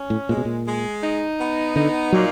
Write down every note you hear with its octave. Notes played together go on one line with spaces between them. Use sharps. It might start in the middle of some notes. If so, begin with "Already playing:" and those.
Already playing: C#4
A2
A#2 G#3
B2
A#2
G#3
D#4
B3
D3 D#4
A#2 F#3